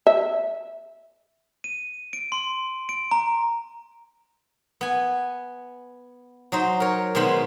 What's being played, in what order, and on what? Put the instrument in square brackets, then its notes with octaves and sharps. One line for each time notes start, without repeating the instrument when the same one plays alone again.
[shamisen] E5
[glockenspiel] D#7
D7
C6
D7
A#5
[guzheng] B3 G#5
F#3 D#4 C5
A#4 C#5
B2 D#3 G#3 B3 C5 B5